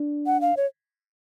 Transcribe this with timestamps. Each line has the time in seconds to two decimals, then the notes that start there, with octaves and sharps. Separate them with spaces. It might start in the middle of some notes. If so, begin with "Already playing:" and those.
Already playing: D4
0.26 F#5
0.41 F5
0.57 C#5